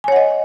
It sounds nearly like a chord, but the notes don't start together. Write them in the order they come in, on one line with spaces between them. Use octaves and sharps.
G#5 C#5 F#5 D#5